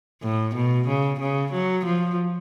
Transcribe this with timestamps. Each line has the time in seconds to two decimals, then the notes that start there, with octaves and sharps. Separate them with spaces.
0.22 A2
0.55 B2
0.87 C#3
1.20 C#3
1.52 F#3
1.85 F3